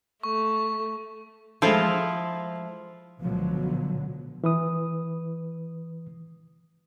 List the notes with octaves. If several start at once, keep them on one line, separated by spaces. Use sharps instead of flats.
A3 C#6
F3 G#3 E4 F4 A4
C#2 B2 D3 F3 F#3
E3 B4 D#6